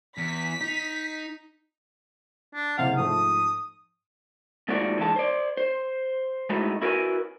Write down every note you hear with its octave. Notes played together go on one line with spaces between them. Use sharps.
E2 B6
D#4
D4
F#1 C3 F5 F#5
G#2 F3 A3 D#6
D#2 G#2 F3 A3 F#4 D5
D3 E3 G#3 E5 A5
C5 D5
C5
G#3 A3 B3 D#4 E4 F#4
E4 F#4 A#4 B4 E5 G#5